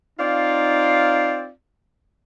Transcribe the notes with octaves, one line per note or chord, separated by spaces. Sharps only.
C4 D#4 F4 D5 F5